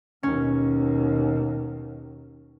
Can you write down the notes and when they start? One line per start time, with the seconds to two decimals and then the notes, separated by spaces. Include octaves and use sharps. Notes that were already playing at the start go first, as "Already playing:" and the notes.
0.23 D#2 B2 C#4